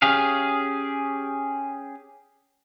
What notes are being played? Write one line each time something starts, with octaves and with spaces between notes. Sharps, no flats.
C#4 G4 G#4 F5